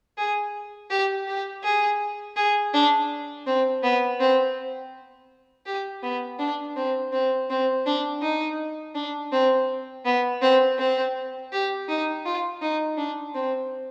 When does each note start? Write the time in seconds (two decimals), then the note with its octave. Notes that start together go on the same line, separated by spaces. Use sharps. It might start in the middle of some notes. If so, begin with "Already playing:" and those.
0.18 G#4
0.90 G4
1.28 G4
1.64 G#4
2.37 G#4
2.74 D4
3.47 C4
3.83 B3
4.20 C4
5.66 G4
6.03 B3
6.39 D4
6.77 C4
7.13 C4
7.50 C4
7.86 D4
8.22 D#4
8.95 D4
9.32 C4
10.05 B3
10.42 C4
10.79 C4
11.52 G4
11.89 D#4
12.25 F4
12.62 D#4
12.98 D4
13.35 C4